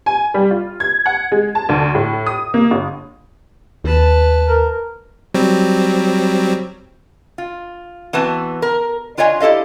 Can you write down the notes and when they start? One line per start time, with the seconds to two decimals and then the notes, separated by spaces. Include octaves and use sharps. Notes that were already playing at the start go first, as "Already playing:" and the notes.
0.06 G#5
0.34 G3
0.51 F4
0.80 G#6
1.06 F#5
1.32 G#3
1.55 A5
1.69 D2
1.95 A2
2.26 D#6
2.54 A#3
2.71 G1
3.84 D#2 B4 A5
4.49 A#4
5.34 F#3 G3 C4
7.38 F4
8.13 E3 B3 C4 F#4 B4 A5
8.62 A#4
9.17 D4 F4 C#5 D#5 F5 G#5
9.40 E4 G4 A4 D#5 F5